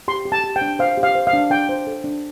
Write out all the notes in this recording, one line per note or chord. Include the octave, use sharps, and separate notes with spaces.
G4 C6
G4
A5
G4
G5
D4
C5 F5
G4
F5
C5
F5
D4
D4 G5
C5
A4
D4